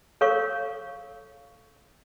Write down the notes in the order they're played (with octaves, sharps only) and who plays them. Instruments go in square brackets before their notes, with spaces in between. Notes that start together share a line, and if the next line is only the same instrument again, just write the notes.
[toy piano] A4 A#4 C#5 F5 C#6